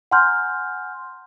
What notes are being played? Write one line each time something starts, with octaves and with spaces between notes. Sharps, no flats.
F#5 G#5 A#5 C6 F6 G6